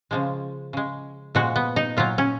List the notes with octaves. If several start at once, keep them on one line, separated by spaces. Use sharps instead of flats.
C#3 F3 G#3
C#3 G#3
A#2 F3 G#3 F#4
B3
D#4
A#2 F#3 F4
C#4